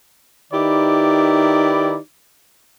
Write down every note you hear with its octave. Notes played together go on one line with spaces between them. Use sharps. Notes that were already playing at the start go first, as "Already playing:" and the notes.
D#3 D#4 E4 G4 B4 D5